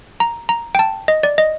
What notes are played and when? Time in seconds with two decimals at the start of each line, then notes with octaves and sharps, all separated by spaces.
0.20 A#5
0.49 A#5
0.75 G5
0.79 A5
1.08 D#5
1.23 D5
1.38 D#5